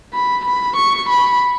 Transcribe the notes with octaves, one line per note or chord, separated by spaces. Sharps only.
B5
B5
C#6
B5